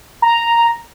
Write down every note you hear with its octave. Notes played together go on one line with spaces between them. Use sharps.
A#5